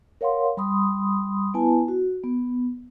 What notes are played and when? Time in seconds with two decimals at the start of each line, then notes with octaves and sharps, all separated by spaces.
0.21 A#4 C#5 F5 F#5 C6
0.57 G3 B5 C6 D#6
1.54 B3 E4 B4 G#5 A5
1.88 F#4
2.24 B3